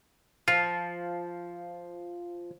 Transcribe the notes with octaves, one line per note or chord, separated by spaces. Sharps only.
F3 F4